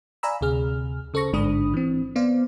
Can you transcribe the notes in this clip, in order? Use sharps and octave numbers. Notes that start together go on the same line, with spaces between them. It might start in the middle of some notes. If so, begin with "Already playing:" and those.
D5 F5 G#5 A#5 B5 E6
D2 C3 G#4 F6
C#3 A4 C5 C#6 A#6
A1 G#2 D3 D4 B5 D#6
E3 C4
B3 C5 D5 F5